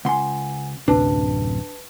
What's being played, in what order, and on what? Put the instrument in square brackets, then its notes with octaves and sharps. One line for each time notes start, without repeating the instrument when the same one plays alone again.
[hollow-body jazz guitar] C#2 C6 [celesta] F#5 G#5
[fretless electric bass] D1 F#2 C3 [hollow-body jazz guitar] D4 [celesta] B4 A5